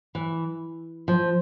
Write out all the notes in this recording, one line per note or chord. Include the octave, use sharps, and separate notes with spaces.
E3
F3